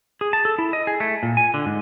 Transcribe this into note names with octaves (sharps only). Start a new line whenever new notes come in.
G#4
A5
A4
E4
D#5
G#4
A3
A#2
G#5
D3
G#2